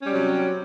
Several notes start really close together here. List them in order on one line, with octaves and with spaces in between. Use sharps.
C#4 G3 F#3 C3